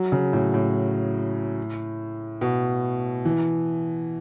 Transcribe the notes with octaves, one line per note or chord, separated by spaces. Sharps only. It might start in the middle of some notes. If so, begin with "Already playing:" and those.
Already playing: F#3
C#3
A2
A2
B2
E3